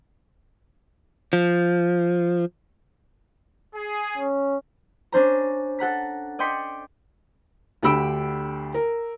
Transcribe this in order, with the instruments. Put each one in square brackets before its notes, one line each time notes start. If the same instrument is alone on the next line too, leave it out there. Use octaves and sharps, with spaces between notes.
[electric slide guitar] F3
[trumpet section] G#4
[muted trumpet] C#4
[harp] C#4 D4 C5 A#5
A4 F#5 A#5 B6
D5 D#5 G5 C6 B6 C#7
[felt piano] D2 D3 G4 B5 E6 D7
A#4